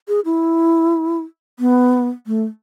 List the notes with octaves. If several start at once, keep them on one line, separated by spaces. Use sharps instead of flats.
G#4
E4
B3
A3